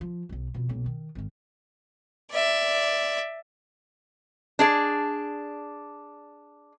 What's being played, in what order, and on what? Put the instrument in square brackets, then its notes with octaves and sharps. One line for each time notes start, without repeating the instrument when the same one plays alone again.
[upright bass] F3
D#1 B1
F2 B2
B1 A#3
D#3
G#1 D#3
[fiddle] D5 E5
[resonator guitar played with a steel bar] D4 G#4 D5